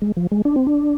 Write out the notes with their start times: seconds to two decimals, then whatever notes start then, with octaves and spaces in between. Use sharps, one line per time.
0.02 G#3
0.17 F3
0.32 G#3
0.45 D4
0.56 C4
0.67 D4